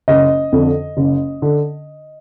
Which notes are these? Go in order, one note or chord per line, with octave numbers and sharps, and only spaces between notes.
F#1 D#5
F2 D3
F#1
D3